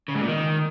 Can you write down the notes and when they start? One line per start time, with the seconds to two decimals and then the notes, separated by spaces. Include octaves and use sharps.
0.09 C#3
0.15 G#2
0.22 A#2
0.28 D#3